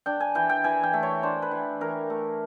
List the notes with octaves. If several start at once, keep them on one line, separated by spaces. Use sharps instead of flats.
D4 G5
G#5
E3 G5
G5
E3 G#5
G5
A3
C#5
D4 C5
B4
E3
E3 A#4
A3